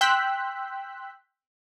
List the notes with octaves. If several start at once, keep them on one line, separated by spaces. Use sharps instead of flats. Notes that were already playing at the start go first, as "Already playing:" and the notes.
G5 C6 E6 F#6 G6 B6